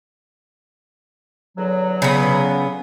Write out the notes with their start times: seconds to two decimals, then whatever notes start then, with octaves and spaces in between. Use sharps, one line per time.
1.58 E2 D3 F#3
2.02 C#3 B3